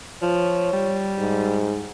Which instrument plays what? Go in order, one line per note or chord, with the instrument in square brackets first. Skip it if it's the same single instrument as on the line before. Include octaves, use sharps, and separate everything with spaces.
[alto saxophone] F3 [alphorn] C#5
[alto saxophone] G3
[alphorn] G#2